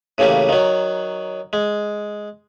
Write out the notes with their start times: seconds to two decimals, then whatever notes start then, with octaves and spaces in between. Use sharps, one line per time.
0.18 A2 C#3 E3 G3 A#3
0.49 D#3 F#3
1.53 G#3